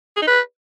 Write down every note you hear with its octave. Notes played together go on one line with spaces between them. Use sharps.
G#4
D#4
B4